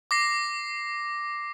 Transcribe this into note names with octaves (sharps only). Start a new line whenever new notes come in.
D6 A#6 C7